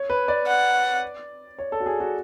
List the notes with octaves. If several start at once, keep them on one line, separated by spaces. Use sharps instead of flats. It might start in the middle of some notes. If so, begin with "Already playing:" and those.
Already playing: C#5
B4
D5
F#5
C#5
A4
F#4
G#4
F#4